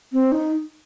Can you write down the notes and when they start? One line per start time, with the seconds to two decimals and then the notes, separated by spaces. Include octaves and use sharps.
0.13 C4
0.32 D#4